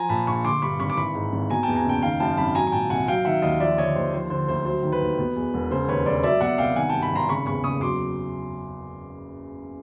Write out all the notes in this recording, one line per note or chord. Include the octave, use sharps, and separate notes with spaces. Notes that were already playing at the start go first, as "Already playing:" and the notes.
Already playing: F3 G#5 A#5
A#2 A5 B5
A#1 B5 C#6
D3 C6 D6
G2 B5 C#6
G#1 B5 C#6
D6
E3 B5 C#6
G#2
G#1
B2 G#5 A#5
G5 A5
E2
G#5 A#5
F#1 G5 A5
D#3 F5 G5
F#2 G5 A5
G#1 A5 B5
F#3 G#5 A#5
G#5
A#2 G5 A5
C2 F#5 G#5
F#3 F5 G5
D#3 E5 F#5
D#2 D#5 F5
F3 D5 E5
D3 C#5 D#5
D#2 C5
F3 C5
D3 C5
D2 C5
F#3 C5
D#3
B4
D#2
B2
E2
E1
C#3 C5
D#2 B4 C#5
E1 C5 D5
F#3 D5 E5
B2 E5 F#5
C2 F5 G5
D#3 F#5 G#5
G2 G5 A5
A5 B5
G#1 A#5 C6
C#3 B5 C#6
E2 B5 C#6
F#1 C#6 D#6
F#3 C6 D6